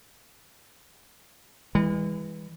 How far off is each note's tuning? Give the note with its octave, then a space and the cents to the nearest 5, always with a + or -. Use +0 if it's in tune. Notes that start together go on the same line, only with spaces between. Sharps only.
E3 -10 G#3 -40